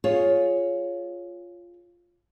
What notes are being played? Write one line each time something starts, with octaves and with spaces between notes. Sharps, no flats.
F4 G#4 C#5